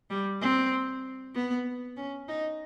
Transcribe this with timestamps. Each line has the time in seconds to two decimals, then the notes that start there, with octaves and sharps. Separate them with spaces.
0.10 G3
0.42 C4
1.35 B3
1.97 C#4
2.28 D#4